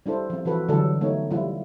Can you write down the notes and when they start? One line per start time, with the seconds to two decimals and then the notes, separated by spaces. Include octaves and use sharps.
0.06 G3 D4 E4 A4 C5
0.30 F3 C4
0.45 E3 F3 F#4 A4 B4
0.69 D3 E3 F#3 G3 A4
1.01 A3 B3 D#4 C#5
1.31 F3 G3 E4 F4